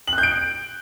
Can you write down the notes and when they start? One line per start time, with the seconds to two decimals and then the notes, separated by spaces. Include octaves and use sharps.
0.07 F#7
0.13 F#6
0.18 G6
0.23 D7